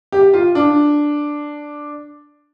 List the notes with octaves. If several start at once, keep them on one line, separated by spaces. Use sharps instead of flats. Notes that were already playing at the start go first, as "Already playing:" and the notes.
G4
F4
D4